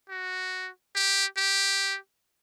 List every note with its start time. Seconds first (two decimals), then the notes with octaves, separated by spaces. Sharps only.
0.09 F#4
0.95 G4
1.37 G4